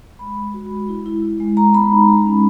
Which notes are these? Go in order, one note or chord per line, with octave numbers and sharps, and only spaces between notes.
G#3 B5
G#3
F#4
G#3
E4
E4
E4
G#3
G#3 A#5
B3 B5
D#4
G#3
C#4